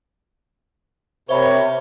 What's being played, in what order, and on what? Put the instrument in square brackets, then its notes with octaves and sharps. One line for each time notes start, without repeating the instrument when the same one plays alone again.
[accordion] C3 [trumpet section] A#4 C#5 [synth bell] C5 E5 B5